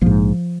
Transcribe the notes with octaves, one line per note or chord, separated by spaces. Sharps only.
A#1 G#2 F3